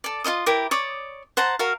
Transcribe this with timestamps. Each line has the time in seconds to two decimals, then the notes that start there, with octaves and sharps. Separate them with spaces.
0.04 A4 D5
0.24 F4 C#5 D#5 D#6
0.46 E4 G4 A#4 D6
0.71 C#5 D5 D#6
1.37 C5 F#5 A5 A#5
1.59 F#4 A#4 F5